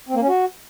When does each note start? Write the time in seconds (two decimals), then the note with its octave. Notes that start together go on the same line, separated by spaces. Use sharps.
0.09 C4
0.15 A#3
0.22 C#4
0.28 F#4